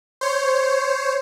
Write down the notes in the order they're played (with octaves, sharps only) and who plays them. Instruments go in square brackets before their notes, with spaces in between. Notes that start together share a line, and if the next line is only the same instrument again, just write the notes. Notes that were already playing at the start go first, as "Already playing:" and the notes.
[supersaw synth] C5 C#5